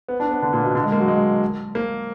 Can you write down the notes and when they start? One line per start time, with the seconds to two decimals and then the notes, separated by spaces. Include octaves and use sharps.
0.08 B3
0.20 D4
0.31 B3
0.42 D3
0.53 A#2
0.64 B2
0.75 D3
0.84 G#3
0.92 A#3
1.00 F#3
1.08 G#3
1.75 A#3